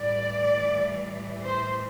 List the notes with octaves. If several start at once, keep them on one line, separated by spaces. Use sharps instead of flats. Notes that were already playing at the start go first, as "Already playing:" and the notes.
Already playing: A2 E3 G3 D5
C5